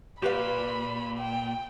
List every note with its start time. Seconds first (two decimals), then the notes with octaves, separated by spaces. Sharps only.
0.22 A#2 G4 B4 F5 B5
1.18 G5